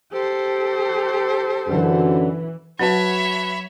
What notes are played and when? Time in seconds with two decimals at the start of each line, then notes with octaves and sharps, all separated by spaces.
0.12 G4 A4 C5
1.68 F#2 D3 E3
2.79 F#3 F#4 B4 C#5 E5 A5 B5